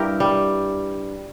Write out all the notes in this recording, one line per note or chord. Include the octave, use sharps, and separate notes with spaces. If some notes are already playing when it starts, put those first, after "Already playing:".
Already playing: G2 E4 G4 A#4
G3